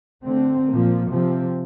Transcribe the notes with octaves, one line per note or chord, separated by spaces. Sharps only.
D3 A3 C4
A#2 F3 A#3
C3 F3 C4